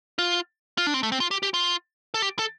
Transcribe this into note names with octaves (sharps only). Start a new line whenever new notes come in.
F4
F4
D4
C4
A3
C4
F4
G4
G4
F4
A4
G4
A4